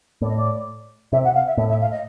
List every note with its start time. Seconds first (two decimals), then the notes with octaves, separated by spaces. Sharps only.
0.21 A2 D5
0.29 D#5
0.36 D5
1.12 C3 E5
1.24 F#5
1.35 F5
1.47 E5
1.57 A2 E5
1.69 E5
1.81 F5
1.91 D#5